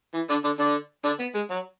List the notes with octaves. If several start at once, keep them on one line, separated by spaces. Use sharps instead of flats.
E3
D3 D4
D3 D4
D3 D4
D3 D4
B3
G#3
F#3